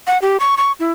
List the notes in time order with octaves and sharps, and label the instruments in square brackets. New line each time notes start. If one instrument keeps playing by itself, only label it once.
[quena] F#5
G4
C#6
C#6
E4